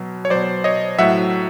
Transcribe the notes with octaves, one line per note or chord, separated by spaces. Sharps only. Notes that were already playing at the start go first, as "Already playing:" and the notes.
Already playing: B2 F#3
C#5
B2 F#3 C5 D5
C#5 D#5
A2 F#3 E5 F#5